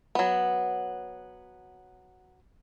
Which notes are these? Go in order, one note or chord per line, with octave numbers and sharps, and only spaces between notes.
F#3 B3